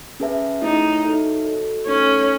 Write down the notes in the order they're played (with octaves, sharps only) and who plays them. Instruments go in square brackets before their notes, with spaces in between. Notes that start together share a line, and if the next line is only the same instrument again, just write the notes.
[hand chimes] C#4 G#4 B4 E5 A5
[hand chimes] A3 E4 G#4 C#5 [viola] D#4
[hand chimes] D#4 F#4 A4 C#5 E5
F#4 A4 D#5 A5
[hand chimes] A3 D#4 A4 [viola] C#4